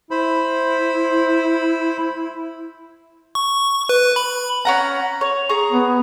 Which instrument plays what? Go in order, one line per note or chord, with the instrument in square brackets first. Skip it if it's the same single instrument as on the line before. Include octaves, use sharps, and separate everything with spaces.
[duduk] E4 [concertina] C5 B5
[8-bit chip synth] C#6
B4
B5
[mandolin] C#4 F#5 A#5
C#5
G#4 A#5 C#6
[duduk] B3